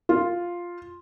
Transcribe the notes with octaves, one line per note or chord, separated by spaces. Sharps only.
F4